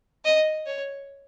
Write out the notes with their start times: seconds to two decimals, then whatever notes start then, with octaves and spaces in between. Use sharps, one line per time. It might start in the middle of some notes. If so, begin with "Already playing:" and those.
0.25 D#5
0.67 C#5